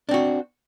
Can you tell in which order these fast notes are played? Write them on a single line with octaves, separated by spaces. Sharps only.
D4 C4 F#4